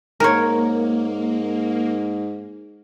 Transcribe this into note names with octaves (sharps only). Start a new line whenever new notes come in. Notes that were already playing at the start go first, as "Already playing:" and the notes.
G#2 A#3 A#4 C#5